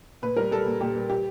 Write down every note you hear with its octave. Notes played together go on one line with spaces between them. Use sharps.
A#2 B4
G3 A#4
G3 A4
A#2
A#2 G4
G3
G4